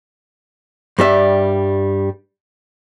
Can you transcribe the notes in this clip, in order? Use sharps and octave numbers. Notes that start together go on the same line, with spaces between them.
G2 G3 E5